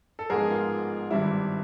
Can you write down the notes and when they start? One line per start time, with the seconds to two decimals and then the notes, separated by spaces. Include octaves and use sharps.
0.19 A4
0.30 A1 G#2 F3 G#3 B3 G#4 A#4
0.50 F4
1.11 G#1 G2 E3 G3 E4